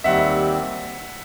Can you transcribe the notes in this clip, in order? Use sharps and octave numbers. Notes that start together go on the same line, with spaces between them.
D#2 D#3 G3 C4 E5 F#5